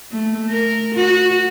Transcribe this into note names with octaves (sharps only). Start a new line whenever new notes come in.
A3
A#4
F#4